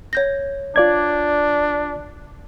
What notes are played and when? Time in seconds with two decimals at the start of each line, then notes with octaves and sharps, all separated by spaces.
0.13 C#5 G6 A#6
0.76 D4 F4 D5 G#6